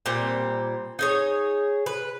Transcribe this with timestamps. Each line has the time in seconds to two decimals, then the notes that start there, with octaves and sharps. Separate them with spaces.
0.06 A#2 G3 C4
0.99 D#4 G#4 C#5
1.86 B4